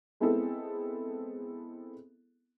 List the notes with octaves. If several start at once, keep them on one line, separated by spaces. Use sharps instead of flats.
G#3 B3 C4 E4 G#4 A4